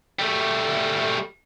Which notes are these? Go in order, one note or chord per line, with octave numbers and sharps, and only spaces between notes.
G3 A3